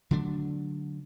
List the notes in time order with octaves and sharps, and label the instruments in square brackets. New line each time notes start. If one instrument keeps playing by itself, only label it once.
[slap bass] D3 F#3 A3 D4